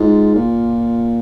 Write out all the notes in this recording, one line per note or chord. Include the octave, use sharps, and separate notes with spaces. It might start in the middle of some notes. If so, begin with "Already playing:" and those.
Already playing: G#2 F4
A#2